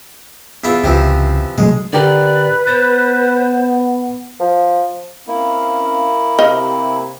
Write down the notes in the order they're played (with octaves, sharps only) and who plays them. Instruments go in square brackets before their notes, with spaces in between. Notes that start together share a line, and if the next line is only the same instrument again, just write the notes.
[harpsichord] E2 E4 F4
[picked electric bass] C#2 [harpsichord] C3 E3 F3
[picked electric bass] C3 F#3 A3 [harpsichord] G#3
[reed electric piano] D3 G4 A#4 [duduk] B4 [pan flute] D5
[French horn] B3 [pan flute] C5 [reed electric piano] A6
[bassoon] F3
[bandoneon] A#3 E4 [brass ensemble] C4 C#4 F5
[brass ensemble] C3 [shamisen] D#5 F5